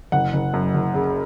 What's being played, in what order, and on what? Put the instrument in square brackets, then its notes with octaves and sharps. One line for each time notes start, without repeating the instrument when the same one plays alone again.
[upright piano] F#1 F#5
F#1
F#2
F#1
C#3